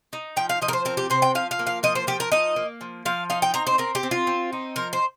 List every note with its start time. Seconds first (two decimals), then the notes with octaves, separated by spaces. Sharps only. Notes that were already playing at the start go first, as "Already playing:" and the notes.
0.13 D#4
0.37 F3 G5
0.49 F5
0.62 F3 D#5
0.68 A#4
0.73 C5
0.85 C4 A#4
0.97 G4
1.10 C3 C5
1.22 G5
1.35 F3 F5
1.51 F5
1.59 A#3
1.67 F5
1.83 F3 D#5
1.95 C5
2.07 F3 G4
2.20 A#4
2.32 D#4 D#5
2.56 A#3
2.81 F3
3.05 F3 F5
3.30 D#4 F5
3.42 G5
3.54 C4 A#5
3.67 C5
3.78 C4 A#4
3.95 G4
4.03 C4
4.11 F4
4.27 C4
4.53 D#4
4.76 F3 A#4
4.93 C5